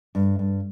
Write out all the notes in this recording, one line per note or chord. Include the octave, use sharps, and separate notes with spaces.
G2
G2